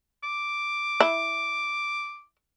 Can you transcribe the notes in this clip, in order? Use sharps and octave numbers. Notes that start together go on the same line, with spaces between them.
D6
E4